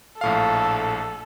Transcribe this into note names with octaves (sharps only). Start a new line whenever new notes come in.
A#1 A2 A4 F5